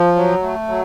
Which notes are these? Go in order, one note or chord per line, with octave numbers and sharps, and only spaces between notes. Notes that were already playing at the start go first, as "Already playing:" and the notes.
Already playing: F3
F#3
A3
F#3